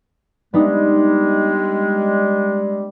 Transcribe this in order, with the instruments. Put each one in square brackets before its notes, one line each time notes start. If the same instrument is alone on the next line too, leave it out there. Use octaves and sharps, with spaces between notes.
[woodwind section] G3 G#3 [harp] B3 D4 D#4